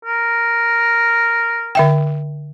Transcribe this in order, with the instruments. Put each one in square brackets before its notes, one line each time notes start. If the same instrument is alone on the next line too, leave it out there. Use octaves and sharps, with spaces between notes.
[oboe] A#4
[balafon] D3 E5 G5